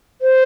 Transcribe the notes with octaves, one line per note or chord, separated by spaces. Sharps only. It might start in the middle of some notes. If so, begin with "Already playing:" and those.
C5